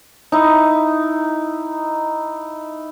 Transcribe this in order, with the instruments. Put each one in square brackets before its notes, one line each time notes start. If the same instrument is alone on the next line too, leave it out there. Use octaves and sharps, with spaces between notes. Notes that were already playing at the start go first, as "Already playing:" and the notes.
[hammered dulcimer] D#4 E4